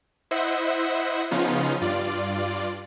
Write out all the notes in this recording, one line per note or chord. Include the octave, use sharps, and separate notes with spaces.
E4 C5 D#5 E5 F#5
C#3 F3 B3 C#4 D#4 F4
G2 F4 D5